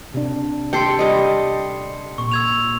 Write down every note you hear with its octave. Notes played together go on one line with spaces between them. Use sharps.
C3 D4
G4 A4 G5 C6 C7 C#7
G3 D#5
A#2 C#6
E6 G#6 F7